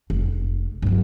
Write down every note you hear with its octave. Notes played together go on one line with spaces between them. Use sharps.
F1
G2 F#3